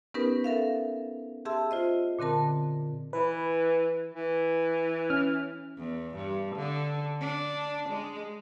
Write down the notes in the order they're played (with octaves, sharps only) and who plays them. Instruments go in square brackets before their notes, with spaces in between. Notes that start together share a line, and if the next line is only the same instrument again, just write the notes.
[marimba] B3 C#4 D#4 G4 A#4 B4
A4 A#4 E5 F5
G4 G#4 E5 A5 C6 E6
F4 C5 D#5
A#2 D3 C4 A#4 A5
[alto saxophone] E3 [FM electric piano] B4
[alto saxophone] E3
[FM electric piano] C#4 F6
[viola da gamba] E2
G2
D3
D4
G#3